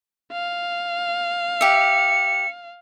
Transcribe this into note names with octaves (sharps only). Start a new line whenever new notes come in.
F5
G4 E5 C#7